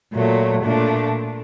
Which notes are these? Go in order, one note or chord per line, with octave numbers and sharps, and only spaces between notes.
A#2 F#3 A3
A#2 A3 D4